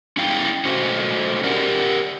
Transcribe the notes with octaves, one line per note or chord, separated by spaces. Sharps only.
C#4 E4 F5 G5
A3 C#4 F#4 C5
G4 A#4 D5 F#5